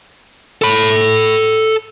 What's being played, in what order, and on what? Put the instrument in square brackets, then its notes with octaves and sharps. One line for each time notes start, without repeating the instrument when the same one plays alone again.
[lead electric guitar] A4 B5